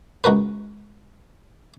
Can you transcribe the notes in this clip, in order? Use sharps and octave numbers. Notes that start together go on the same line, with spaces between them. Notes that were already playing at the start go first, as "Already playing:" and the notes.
C#2 F#4 A#4 B4